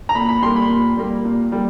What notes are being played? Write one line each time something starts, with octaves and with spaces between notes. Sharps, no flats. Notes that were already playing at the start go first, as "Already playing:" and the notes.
A#5
A#2 B5
B5
G3 A#3 C6
B5
A#2
G3 A#3
A#2
G3 A#3